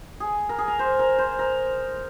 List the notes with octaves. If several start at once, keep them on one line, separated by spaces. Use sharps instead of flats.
G#4
A#4
G#4
A#4
C5
A#4
C5
A#4